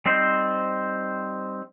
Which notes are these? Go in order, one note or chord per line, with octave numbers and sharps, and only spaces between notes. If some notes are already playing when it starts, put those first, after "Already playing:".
G3 C4 D#4 C5